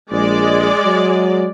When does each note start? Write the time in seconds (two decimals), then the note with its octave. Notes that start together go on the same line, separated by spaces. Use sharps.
0.12 A#1 G#3 D5
0.85 F#3